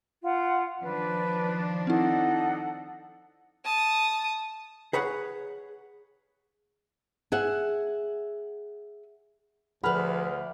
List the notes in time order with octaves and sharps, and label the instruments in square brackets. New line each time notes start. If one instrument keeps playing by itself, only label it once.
[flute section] F4 F#5
[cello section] D#3 F3 D4 [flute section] B4
[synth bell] C4 E4 [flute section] D#4 A4 F#5
[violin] A5 D#6
[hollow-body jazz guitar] G#4 B4 C#5 F#5
[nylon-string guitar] G#4 E5 F#5
[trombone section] D2 [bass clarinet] F3 [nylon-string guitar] G#4 B4 [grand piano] F#5 B5 F6